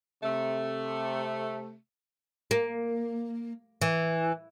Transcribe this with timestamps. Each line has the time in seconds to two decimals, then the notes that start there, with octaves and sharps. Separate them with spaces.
0.23 C3 A3
2.51 A#3
3.81 E3